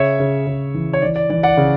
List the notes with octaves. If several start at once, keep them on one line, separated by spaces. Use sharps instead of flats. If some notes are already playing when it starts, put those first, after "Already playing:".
Already playing: C#3 C#5 E5
C#3
C#3
E3
C#5
E3 D5
D5
E3 D5
D5 F#5
C#3